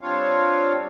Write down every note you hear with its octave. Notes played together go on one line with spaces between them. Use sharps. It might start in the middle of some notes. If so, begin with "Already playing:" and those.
G3 C4 D4 F4 C#5 F5